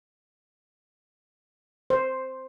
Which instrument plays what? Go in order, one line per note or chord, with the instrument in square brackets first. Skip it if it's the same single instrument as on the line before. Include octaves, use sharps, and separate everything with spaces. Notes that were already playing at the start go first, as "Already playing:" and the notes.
[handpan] C5